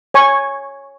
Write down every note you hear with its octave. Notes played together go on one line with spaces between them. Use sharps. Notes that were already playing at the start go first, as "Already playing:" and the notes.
C#5 G#5 C#6